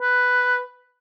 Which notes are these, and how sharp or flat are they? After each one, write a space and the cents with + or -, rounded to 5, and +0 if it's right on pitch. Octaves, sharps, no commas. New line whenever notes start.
B4 +5